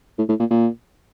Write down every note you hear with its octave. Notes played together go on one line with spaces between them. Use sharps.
A2
A2
A#2
A#2